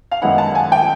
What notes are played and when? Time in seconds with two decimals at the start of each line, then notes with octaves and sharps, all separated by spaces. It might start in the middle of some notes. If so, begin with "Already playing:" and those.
0.11 F5
0.22 F#2 D#3 G#3 B3 E4 F#5
0.38 A5
0.55 G#5
0.72 G5